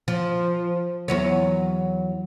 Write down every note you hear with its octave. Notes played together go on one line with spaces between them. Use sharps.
F3
E2 F#3 C#5